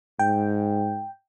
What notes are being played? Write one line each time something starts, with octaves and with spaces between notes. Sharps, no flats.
G#2 G5